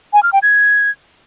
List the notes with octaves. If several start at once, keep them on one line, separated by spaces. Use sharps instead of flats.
G#5
F6
G5
G#6